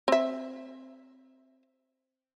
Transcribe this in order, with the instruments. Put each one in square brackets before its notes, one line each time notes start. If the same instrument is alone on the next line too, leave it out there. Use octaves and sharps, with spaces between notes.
[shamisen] C4 E5